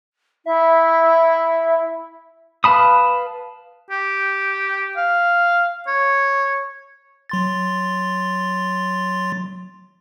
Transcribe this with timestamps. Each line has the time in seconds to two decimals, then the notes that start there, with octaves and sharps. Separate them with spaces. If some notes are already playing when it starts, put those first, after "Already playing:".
0.46 E4 E5
2.64 B4 F5 A5 B5 D#6
3.91 G4
4.97 F5
5.88 C#5
7.29 F#3 C6 A6